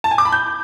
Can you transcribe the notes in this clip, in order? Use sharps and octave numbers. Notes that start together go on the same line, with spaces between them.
A5
G#5
D6
B5
G6